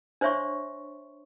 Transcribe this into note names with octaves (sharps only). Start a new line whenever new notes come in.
D4 C5 C#5 E5 C6 C#6